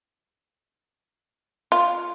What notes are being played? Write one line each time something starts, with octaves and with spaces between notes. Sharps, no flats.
F4